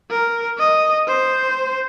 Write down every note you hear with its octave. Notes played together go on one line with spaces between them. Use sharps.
A#4
D#5
C5